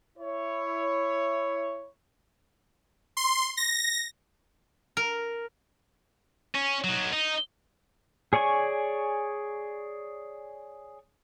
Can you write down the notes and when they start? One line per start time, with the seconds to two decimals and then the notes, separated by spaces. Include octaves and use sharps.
0.18 E4 C#5
3.17 C6
3.57 A#6
4.97 A#4
6.55 C#4
6.84 F#3 D#4
7.13 D#4
8.33 G#4 C#5 D5 G#5 C#6